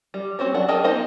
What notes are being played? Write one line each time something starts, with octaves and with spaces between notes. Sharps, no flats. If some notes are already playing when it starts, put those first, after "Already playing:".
G3
C4 F#4 C5 C#5
F#3 D4 F#5
G#4 A#4 D#5 G5 A5
B3 D#4 C5 D#5 F5